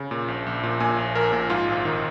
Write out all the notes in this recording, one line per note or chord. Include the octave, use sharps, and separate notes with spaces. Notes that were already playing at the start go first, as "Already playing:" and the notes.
Already playing: C#3
A#2
A#1
A#1
A#2
A#2 G#5
A#1
A#1 A#4
A#2
G#2 F4
G#1
D#3